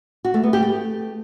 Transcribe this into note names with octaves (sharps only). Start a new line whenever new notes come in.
F#4
A3
B3
G4
A3